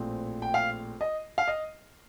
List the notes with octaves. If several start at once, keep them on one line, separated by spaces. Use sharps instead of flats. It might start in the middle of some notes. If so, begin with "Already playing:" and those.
Already playing: A#1 A2 A3 C4
G5
F5
D#5
F5
D#5